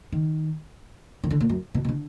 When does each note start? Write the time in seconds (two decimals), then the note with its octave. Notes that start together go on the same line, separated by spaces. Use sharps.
0.12 D#3
1.24 D#3
1.30 D3
1.40 A#2
1.49 F#2
1.74 B2
1.85 B2
1.89 D3